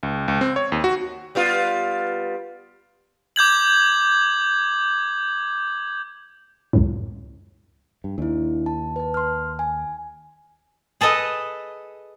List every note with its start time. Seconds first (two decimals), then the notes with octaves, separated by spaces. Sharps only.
0.03 C#2
0.28 C#2
0.41 C4
0.56 C#5
0.72 D#2
0.84 F#4
1.35 G3 B3 F4
3.36 D6 G6 G#6 F#7
6.73 C#2 F#2 A2
8.04 G2
8.18 D#2 D4 E4
8.66 A5
8.96 B4 A5
9.14 C6 F6
9.59 G#5
11.01 G#4 A4 B4 D#5